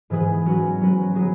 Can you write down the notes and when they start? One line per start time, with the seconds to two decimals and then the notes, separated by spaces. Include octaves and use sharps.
0.10 G#2 E3 B3 G#4 B4
0.45 F#3 C#4 F#4 B4
0.81 F#3 C#4 F#4 B4
1.14 F#3 B3 G#4 B4